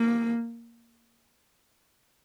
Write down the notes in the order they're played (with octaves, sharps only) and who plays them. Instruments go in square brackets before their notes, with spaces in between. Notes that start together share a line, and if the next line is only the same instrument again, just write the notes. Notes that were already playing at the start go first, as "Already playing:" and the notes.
Already playing: [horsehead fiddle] A#3